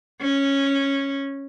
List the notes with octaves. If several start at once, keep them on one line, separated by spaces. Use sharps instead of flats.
C#4